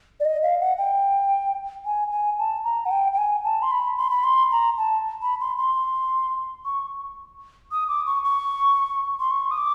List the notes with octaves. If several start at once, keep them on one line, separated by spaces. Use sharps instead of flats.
D5
D#5
F5
F#5
G5
G#5
G#5
A5
A#5
F#5
G5
G5
G#5
A5
C6
B5
C6
B5
C6
A#5
A5
B5
C6
C6
C#6
D#6
D6
C#6
C#6
C6
C#6
D#6
D6